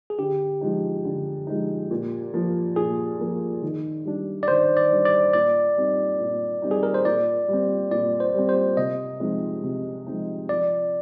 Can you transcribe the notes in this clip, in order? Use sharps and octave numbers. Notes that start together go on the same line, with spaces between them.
G#4
D3 G4
F3 G#3 D#4
D3
F3 G#3 D#4
A#2
F3 A#3
A#2 G#4
F3 A#3
D#3
G3 D4
D5
D#3 C5
D5
G3 D4
D5
A#2 D5
G3 C4 D#4
A#2
G3 C4 D#4
G#4
A#4
C5
A#2 D5
G3 C4
A#2 D5
C5
G3 C4
C5
C3 D#5
F3 G#3 C4 D#4
C3
F3 G#3 C4 D#4
F3 D5